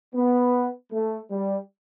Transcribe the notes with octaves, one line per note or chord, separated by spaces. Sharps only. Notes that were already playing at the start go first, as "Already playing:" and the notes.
B3
A3
G3